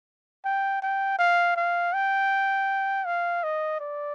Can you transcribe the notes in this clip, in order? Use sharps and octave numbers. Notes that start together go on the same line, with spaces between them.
G5
G5
F5
F5
G5
F5
D#5
D5